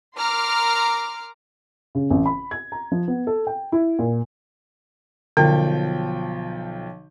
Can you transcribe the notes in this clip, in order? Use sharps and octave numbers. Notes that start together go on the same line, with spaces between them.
A#4 A#5 C6 D6 F6
C#3
A1
B5
G#6
A#5
F3
B3
A4
G5
E4
A#2
B1 D3 F3 G5